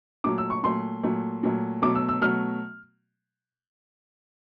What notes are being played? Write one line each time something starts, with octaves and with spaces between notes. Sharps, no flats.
A#2 F#3 A3 D6
E6
C#6
A#2 F#3 A3 C6
A#2 F#3 A3
A#2 F#3 A3
B2 F#3 A3 D6
E6
E6
B2 F#3 A3 F6